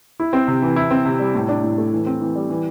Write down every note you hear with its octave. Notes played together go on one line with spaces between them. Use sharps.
E4
C4
C3
E3
E4
C4
C3
G3
A2
D4
A2
A3
E3
C4
E3
G3
E3